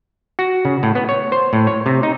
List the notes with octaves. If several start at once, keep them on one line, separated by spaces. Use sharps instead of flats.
F#4
C#3
A2
B3
C#5
C5
A2
C#5
C3
D#4